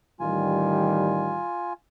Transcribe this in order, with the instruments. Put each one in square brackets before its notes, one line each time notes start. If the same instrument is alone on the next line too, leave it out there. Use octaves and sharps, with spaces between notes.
[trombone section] A1 D#3 G3 [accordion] F4 G#5